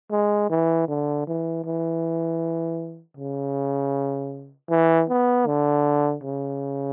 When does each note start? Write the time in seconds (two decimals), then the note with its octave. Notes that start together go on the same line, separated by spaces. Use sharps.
0.11 G#3
0.50 E3
0.88 D3
1.27 E3
1.65 E3
3.17 C#3
4.70 E3
5.09 B3
5.47 D3
6.23 C#3